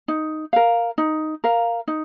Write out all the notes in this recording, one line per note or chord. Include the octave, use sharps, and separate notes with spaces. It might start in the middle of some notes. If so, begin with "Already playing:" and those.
D#4
A#4 F5
D#4
A#4 F5
D#4